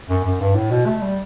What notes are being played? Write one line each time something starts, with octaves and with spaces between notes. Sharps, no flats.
F#2
F#2
G2
A2
B2
A3
G3